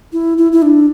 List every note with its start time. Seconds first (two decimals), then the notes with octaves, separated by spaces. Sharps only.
0.13 E4
0.38 E4
0.52 E4
0.62 D4